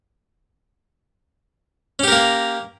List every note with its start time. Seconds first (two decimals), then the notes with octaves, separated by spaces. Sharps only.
1.99 C#4
2.04 G4
2.08 A#4
2.12 A#3